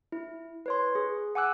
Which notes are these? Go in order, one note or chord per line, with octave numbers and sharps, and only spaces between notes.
E4
B4 C#5 C6
G#4
F#5 G#5 D6 E6 F#6